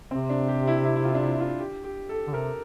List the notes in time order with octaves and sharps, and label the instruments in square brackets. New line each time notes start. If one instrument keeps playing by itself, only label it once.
[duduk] C3 [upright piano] C4
[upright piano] D4
G4
E4
E4
E4
F4
D4
E4
F4
G4
G4
A4
[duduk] D3
[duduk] C3 [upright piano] A#4